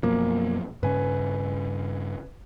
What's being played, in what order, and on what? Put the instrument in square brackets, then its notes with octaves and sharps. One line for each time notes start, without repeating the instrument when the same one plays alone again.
[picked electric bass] F#2 B2 F3 [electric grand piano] A#3
[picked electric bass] G2 C#3 C#4 [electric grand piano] B4 G#5